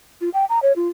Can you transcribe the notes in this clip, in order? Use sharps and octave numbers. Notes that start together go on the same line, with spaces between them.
F4
G5
A#5
C#5
F4